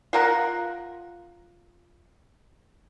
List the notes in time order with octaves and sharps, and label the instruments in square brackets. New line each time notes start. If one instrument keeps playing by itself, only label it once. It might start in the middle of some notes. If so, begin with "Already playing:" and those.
[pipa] F4 A#4 F#5